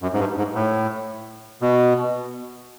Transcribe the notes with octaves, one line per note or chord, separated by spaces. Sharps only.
F#2
G#2
G2
G#2
A2
B2